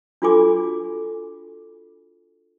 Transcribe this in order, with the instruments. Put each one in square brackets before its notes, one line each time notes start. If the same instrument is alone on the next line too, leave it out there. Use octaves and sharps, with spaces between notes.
[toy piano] D4 F4 F#4 A4 G#5 D6